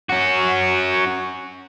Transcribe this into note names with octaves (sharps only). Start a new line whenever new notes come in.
C#4 F#4